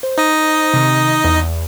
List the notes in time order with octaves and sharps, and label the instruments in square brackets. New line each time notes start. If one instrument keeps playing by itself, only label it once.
[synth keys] C5
[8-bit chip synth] D#4 D#5
[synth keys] C3 D#3
E2